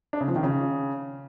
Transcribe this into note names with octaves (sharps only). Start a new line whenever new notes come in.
D4
C#3
F3
D#3
C#3